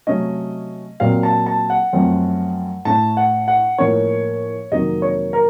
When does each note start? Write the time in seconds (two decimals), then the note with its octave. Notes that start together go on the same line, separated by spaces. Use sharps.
0.07 C3 F#3 A3 C#4 D#5
1.00 A#2 F#3 C4 F5
1.23 A5
1.46 A5
1.70 F#5
1.93 F#2 F3 A3 C4
2.85 A2 A3 C#4 A5
3.17 F#5
3.48 F#5
3.78 A2 F3 A#3 C#4 C#5
4.71 F2 C3 D#3 F#3 A#3 D#5
5.02 C#5
5.33 A#4